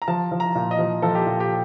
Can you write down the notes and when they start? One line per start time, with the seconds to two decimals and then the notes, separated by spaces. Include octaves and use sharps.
0.02 A#5
0.08 F3 A5
0.32 F3
0.40 A#5
0.55 A#2
0.71 D#5
0.79 F3
1.02 F3 A4
1.15 G4
1.26 A#2
1.40 G4